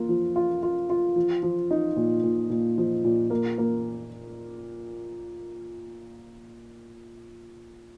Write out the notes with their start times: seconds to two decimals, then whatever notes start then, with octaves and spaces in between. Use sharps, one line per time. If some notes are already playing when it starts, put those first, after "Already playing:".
Already playing: A#3 F4
0.09 F3
0.36 F4
0.63 F4
0.90 F4
1.16 F3
1.43 F3
1.71 D#4
1.96 A#2
2.24 A#2
2.50 A#2
2.78 F3
3.04 A#2
3.30 A#3
3.58 A#3